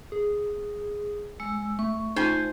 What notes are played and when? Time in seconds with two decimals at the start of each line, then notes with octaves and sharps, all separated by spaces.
0.12 G#4
1.40 G#3 E6
1.79 A3 C#6
2.16 D#4 F4 C5 G#5